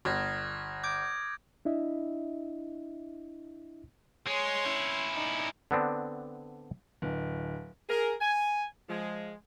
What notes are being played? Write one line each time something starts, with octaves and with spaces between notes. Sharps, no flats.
G1 D#6 F6 G#6 A#6
D6 G6 G#6 D7
D4 E4 D#5 E5
G#3 C#5 C6
C#4 E4
D#4 D5
D3 B3 C4 D4
D1
G#4 A#4
G#5
F3 G#3